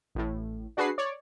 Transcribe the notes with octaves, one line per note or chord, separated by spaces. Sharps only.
A1 A2
D4 F#4 G#4 B4 C7
C#5 D5